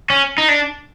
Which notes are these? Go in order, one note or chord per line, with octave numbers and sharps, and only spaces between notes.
C#4
D#4
D4